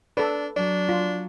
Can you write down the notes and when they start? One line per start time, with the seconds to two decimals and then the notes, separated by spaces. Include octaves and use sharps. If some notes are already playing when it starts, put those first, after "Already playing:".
0.17 D4 A4 B4
0.56 F#3 D4
0.89 F4